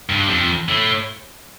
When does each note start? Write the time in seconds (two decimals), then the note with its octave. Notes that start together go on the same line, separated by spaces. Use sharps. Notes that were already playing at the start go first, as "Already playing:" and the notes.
0.10 G2
0.29 F2
0.69 A2